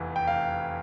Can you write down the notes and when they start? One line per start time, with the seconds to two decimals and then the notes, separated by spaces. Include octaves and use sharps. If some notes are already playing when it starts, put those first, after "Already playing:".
Already playing: F1 E2 E3
0.16 G5
0.27 F1 F5